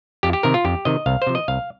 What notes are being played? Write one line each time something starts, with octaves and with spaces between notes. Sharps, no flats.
F2 G4
G4
C3 D#3 A#4
F4
F2 G4
C3 D#3 D#5
C2 F5
C5
C3 F3
D#5
C2 F5